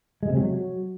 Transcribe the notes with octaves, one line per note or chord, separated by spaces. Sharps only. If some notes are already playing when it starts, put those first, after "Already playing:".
G#3
C3
F#3